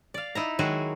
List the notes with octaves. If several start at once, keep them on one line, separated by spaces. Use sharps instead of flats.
D5 F5
D#4 E4 A#5
D#3 F#3 G#3 F#4 G#4